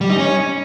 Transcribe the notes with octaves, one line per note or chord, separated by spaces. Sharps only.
G3
D#4
C#4